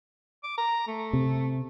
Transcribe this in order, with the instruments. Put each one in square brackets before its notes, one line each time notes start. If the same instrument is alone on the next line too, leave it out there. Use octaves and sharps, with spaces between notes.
[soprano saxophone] D6
A#5
A3
[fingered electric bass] C3